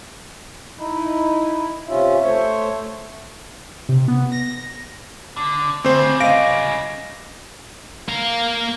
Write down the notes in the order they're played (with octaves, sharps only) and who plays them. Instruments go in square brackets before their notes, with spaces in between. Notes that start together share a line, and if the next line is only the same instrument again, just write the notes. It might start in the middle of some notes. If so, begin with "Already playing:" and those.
[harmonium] D#4 E4
[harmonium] C3 C#4 F4 [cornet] E5
[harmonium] A3 C5 C#5
[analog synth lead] C3
B3
A#6
[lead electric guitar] D3
[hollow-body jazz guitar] D2 [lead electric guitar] C#3 G3 [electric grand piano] C4 C5
[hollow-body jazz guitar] D#5 F5 [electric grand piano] A#6 D7
[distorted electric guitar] A#3 F5